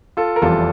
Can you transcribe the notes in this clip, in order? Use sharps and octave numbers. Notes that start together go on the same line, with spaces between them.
F4 A4
A#4
F1 E2 E3 G3 F4 A4